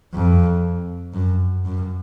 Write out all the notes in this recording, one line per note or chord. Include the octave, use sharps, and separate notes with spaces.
F2
F#2
F#2